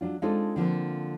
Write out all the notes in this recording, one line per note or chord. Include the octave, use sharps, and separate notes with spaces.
F#3 D4 F4
G#3 C4 D4 D#4 F4 A4
D3 F3 A#3 C4